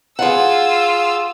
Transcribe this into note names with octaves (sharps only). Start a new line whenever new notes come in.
F4 G#4 F#5 E6